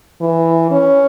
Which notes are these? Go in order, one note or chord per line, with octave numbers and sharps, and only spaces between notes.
E3
C#4